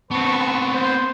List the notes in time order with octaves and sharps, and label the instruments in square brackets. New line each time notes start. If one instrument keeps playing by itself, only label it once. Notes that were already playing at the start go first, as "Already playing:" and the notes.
[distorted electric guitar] B3 C4 [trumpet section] B4 A5 C#6
[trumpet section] C5